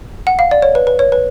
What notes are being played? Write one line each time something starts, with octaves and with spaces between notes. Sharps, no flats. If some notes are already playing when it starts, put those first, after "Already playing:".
F#5
F5
D5
C#5
B4
B4
C#5
B4